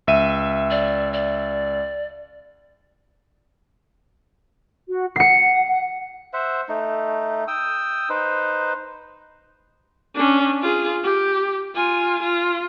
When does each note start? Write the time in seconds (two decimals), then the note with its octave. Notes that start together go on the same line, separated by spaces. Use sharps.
0.07 C#2 E5 D#7
0.71 D5
1.13 D5
4.87 F#4
5.16 F#5 C7 C#7
6.33 C5 E5 F#5
6.69 A3 D#4
7.48 G5 D#6 E6
8.09 D#4 B4 C5
10.15 C#4 D4
10.62 F4 G#4
11.03 G4
11.75 F4 G#5
12.23 F4